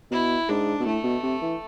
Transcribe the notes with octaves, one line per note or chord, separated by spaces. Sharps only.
B2 E4
G#2 D4
B2
A2 A3
B2
C3
E3